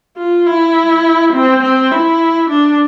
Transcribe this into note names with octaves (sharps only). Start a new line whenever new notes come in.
F4
E4
C4
C4
E4
D4